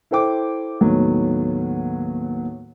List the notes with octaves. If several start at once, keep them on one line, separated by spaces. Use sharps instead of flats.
E4 A4 C5 G5 D6
D#2 A2 D#3 F#3 B3